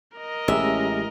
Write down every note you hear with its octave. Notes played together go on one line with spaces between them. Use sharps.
A#4 D#5
A1 G#3 C#4 G4 E5